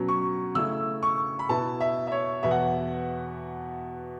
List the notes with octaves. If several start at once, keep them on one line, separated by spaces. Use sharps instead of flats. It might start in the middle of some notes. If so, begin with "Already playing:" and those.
Already playing: B2 F#3 C#4
C#6
C#3 A3 E4 E6
C#6
B5
B2 B3 E4 A5
E5
E5
C#5
E2 B2 B3 E5
F#5